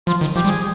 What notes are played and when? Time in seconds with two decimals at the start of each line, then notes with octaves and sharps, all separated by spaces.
0.07 F3 F4
0.21 D#3
0.36 F3 G4
0.45 G3
0.48 G#4